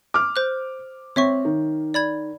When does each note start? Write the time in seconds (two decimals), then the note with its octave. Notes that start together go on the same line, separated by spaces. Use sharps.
0.14 D6 F6
0.36 C5 F#6
1.16 C4 C#5 E5 C#6
1.45 D#3
1.94 D5 B5 G#6